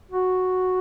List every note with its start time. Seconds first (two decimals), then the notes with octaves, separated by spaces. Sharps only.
0.11 F#4